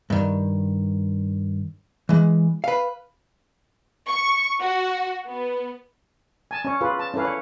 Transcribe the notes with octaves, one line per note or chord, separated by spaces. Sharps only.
G2 D#3
E3 G#3
B4 F5
C#6
F#4
B3
G#5 A5
C#4 C#5
F4 G#4 B4
A5
C#4 E4 A4 B4 F5
C#5